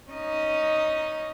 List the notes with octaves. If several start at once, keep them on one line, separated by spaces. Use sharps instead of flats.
C#4 D#4 D#5